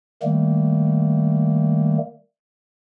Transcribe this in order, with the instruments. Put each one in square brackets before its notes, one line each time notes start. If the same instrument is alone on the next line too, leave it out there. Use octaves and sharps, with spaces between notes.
[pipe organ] D#3 G3 A3 A#3